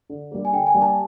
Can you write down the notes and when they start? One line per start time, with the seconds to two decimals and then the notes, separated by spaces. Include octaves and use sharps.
0.10 D3
0.32 G3 A#3
0.45 G#5
0.53 D3 G5
0.67 G#5
0.74 G3 A#3
0.82 A5